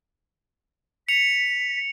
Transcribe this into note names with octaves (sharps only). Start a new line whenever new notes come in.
B6 C#7 F7